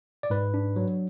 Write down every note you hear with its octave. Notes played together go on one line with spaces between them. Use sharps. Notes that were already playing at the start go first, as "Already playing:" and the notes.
D5
G#2 B4
D4
F#3